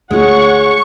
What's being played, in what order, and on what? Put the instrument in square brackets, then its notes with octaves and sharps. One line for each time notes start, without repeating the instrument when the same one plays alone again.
[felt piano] D2 [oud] G#3 F4 [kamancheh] C#5 F#5 [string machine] C#6